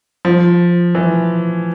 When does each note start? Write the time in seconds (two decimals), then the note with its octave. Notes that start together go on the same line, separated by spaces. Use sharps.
0.25 F3
0.95 E3